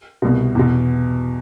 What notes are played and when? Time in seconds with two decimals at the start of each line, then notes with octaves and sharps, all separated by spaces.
0.22 C2 B2
0.55 E2 B2